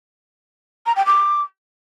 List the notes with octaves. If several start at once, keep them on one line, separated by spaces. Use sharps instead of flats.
A#5
G5
D6